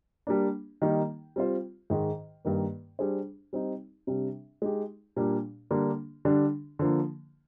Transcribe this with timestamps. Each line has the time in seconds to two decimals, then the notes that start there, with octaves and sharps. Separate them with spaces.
0.27 G3 A#3 D4
0.82 D#3 G3 A#3 D#4
1.36 G3 C4 F4 C5
1.90 G#2 D#3 G#3
2.45 G2 D#3 A#3
2.99 G3 D4 G#4 C5
3.53 G3 C4 D#4
4.07 C3 G3 D4
4.62 G#3 D#4 G4
5.16 A#2 G3 A#3 D4
5.71 D3 G3 A#3 D4
6.25 D3 G3 D4
6.79 D3 F3 A#3